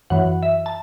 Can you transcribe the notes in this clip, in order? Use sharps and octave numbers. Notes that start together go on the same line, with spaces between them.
F#2 E3 F#5
E5
A5